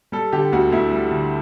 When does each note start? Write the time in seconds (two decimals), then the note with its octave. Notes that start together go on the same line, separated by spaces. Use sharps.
0.12 G3 A4
0.32 D3 G4
0.52 D2 F#4
0.72 D2 E4
0.91 G3
1.11 D3